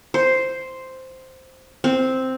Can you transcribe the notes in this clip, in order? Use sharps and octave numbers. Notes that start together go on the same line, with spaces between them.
C5
C4